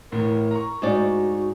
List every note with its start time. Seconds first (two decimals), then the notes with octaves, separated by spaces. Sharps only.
0.12 A1 A2 A#4
0.51 A#5 C#6
0.82 G#2 D#4 F#4 D5